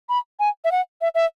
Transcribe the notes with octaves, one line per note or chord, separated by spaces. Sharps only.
B5
G#5
E5
F#5
E5
E5